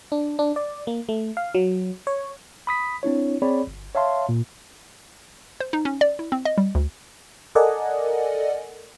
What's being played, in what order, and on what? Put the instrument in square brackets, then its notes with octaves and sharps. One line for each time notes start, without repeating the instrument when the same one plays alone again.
[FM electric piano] D4
D4
D5
A#3
A3
F5
F#3
C#5
[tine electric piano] B5 D#6 B6
C4 D4 E4 C#5
C4 G#4 C#5 D5 B5
G1
C#5 E5 F5 A5 C6
A#2
[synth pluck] C5
D#4
C#4
D5
E4
C4
D#5
G3
D2
[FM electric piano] A4 A#4 D5 D#5 F#5 G#5